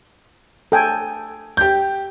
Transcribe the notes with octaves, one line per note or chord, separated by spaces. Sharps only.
A4 G5 G#5
G4 G6